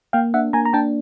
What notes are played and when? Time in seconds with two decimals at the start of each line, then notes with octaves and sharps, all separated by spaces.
0.13 A#3 F5 G5
0.34 D4 E5 F#5
0.53 A#3 G#5 A#5
0.65 A#5
0.73 D4 G5 A5